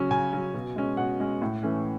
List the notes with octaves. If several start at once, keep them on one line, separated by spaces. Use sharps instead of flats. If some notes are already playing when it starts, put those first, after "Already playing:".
Already playing: C#3 F#3 C#4
C#3 G#5
F#3 C#4
B2
G#3 C#4
B2 F#5
G#3 C#4
A2
E3 A3 C#4